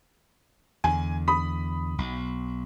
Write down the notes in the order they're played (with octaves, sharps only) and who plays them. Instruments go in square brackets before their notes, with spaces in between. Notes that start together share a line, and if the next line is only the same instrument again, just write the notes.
[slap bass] E2 D3 [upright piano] G#5
[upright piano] B5 D#6 B6
[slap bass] B1